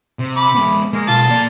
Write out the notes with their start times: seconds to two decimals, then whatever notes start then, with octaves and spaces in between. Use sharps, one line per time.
0.19 C3
0.37 B5 D6
0.55 G#3 B3
0.93 G#3 A#3
1.08 B1 F4 A5
1.30 A#3 D5